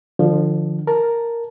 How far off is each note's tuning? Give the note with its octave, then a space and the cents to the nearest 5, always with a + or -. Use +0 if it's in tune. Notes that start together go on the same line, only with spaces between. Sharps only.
D3 +30 F3 +0
A#4 +0 A5 +0